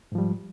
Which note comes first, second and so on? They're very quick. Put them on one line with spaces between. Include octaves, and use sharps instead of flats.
G#2 F3 G3